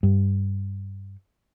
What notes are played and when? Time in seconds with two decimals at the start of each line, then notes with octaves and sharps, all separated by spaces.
0.03 G2